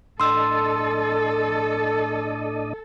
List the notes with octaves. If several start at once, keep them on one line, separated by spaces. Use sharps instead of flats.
A2 D4 A4 D#5 C6 E6